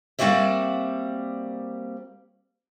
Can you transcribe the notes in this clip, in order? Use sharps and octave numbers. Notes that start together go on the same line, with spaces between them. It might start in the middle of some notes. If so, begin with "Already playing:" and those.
G3 A#3 C4 F#4 D5 E5